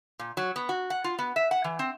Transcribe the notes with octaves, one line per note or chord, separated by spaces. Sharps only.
A#2
F#3
B3
F#4
F#5
F4
B3
E5
F#5
E3
C4